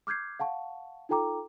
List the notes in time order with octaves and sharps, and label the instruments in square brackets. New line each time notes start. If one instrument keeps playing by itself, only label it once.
[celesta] D6 F6 G6 G#6 C7
F5 F#5 A5 C#6
D#4 F4 A4 G5 A#5 D6